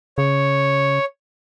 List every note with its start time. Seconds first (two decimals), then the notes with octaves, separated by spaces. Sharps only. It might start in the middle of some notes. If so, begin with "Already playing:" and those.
0.18 C#3 C#5